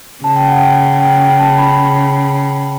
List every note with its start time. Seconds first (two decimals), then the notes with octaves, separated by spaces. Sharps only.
0.24 C#3 A5
0.36 G5
0.47 F#5
0.57 G5
1.01 G5
1.20 G5
1.39 A5
1.58 B5